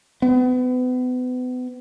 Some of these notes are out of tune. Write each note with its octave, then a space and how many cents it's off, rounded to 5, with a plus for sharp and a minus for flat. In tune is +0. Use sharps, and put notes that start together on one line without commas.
B3 +35